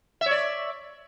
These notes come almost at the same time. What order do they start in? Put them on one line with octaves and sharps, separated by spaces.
E5 C#5 D5